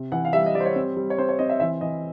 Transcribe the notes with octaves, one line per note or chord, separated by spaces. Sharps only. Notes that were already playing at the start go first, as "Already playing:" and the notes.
Already playing: C3
E3 F#5
F5
G3 E5
D#5
G3 D5
C5
C#5
C4
G3
C#5
C4 C5
C#5
C4 D#5
E5
E3 E5
E3 D#5